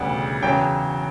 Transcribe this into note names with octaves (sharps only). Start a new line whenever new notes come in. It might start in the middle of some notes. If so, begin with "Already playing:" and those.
Already playing: E1 D2 C#3 G3 B3 F#5
E2 C#3 F#3 C#4 G5